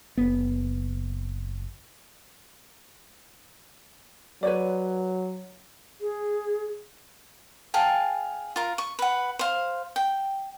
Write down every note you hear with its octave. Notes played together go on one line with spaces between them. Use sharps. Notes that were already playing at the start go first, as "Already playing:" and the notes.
F#1 B3
F#3 B4 C#5 D5
G#4
G#4 F5 G5 A5
F4 A#4
C#6
B4 F#5
C5 F5
G5